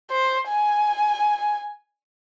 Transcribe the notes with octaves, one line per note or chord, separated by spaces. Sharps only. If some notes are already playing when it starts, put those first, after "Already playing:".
C5
G#5